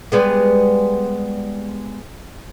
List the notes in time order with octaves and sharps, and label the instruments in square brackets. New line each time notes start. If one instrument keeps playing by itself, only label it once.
[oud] G3 G#3 B3